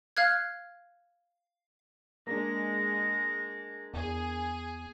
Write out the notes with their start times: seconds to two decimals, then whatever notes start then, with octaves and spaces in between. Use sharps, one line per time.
0.17 F5 F6 F#6 G#6
2.27 G#3 A#3 D4 A#6
3.94 E2 G#4